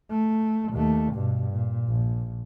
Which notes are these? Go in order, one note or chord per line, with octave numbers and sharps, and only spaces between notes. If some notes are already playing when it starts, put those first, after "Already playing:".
A3
D#2 A3
G2 B2
A#2
A#1